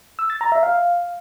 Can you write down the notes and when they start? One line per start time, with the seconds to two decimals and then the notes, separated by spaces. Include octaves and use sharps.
0.19 E6
0.30 A6
0.41 A#5
0.52 E5
0.63 F5